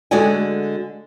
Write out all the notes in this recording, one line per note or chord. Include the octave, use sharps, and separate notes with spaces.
D3 G#3 F#4 D5 F#5 G#5